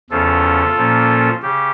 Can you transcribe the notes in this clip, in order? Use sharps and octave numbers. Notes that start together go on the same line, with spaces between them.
E2 C#3 F3 C#4 F4 A4
A#2 F3 A#3 C#4
C#3 G4